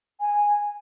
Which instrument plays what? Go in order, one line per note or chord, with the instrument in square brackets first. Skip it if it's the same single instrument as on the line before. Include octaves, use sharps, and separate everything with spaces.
[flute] G#5